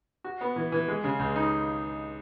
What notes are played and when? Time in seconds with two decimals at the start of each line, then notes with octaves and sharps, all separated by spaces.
0.24 F#4
0.41 B3
0.56 E3
0.72 E3
0.88 G#3
1.04 C#3
1.19 C#2
1.36 D#4